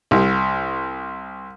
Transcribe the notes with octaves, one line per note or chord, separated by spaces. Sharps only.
C2